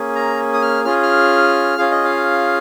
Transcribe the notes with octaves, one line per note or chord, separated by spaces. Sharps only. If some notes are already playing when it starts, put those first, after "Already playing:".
Already playing: A#3 C#4 G#4
A#5
D#6
F6
C#4 F4 G#4 F6
F6
C#4 F4 G#4 F5
D#5
F5